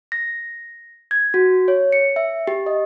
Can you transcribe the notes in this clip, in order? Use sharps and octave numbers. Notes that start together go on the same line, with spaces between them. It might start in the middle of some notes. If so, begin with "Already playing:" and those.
A#6
G#6
F#4
C#5
C#7
E5
G4
D#5